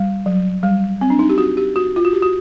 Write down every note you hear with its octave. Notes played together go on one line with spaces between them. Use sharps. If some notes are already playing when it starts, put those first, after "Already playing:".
Already playing: G3
F#3
G3
C4
D4
D#4
G4
F#4
G4
F#4
F4
F#4
G4
F#4